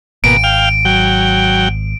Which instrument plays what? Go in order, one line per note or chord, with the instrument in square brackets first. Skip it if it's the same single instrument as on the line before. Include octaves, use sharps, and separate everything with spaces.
[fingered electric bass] G#1 [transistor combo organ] B2 A#3 [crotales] D7
[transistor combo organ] F5 G5
F#3 G5